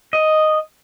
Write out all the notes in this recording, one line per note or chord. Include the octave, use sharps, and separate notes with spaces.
D#5